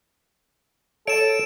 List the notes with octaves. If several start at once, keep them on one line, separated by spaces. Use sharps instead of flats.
A4 C#5 D7 E7